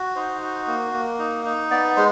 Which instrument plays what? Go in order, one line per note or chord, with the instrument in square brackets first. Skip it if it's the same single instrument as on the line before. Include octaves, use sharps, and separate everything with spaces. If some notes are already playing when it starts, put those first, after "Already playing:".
Already playing: [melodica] F#4
D#4 C5
F#4
A#3
A#3
D#4
D#4
B3 D5
G#3 C5